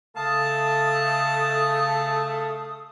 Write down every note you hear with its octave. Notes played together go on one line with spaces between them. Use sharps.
C#3 A3 A4 F5 A5 D#6